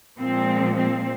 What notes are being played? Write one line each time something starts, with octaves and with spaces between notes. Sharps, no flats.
A#2 F3 G#3 C4
C4